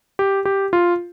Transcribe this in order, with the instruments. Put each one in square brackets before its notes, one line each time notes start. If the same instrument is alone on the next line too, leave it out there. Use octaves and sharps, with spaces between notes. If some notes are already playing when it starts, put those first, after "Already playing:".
[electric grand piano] G4
G4
F4